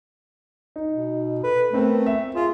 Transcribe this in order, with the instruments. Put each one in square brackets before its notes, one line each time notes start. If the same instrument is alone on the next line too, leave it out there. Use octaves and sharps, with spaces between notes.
[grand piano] D#4
[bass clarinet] B2
[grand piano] A4 [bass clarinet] B4
[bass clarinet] A3 [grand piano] B3 C4 A#4
[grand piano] E5
[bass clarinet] F4 [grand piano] G#4